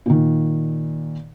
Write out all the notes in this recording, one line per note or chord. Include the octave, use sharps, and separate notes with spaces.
A#2 D#3